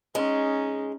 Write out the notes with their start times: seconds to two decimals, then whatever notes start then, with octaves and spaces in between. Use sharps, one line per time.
0.15 G#3 C#4 D#4